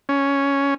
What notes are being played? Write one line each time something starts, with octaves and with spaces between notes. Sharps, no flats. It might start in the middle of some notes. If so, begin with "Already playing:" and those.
C#4